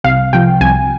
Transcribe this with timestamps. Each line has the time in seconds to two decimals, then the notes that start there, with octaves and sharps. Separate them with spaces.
0.04 C2 F5
0.33 C3 F3 G5
0.61 C2 G#5